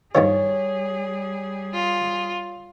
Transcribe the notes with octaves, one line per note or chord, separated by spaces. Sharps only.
G2 D#3 F3 G3 G#4 C#5
F4